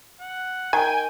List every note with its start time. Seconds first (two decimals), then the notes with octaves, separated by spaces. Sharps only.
0.21 F#5
0.73 D#3 G5 G#5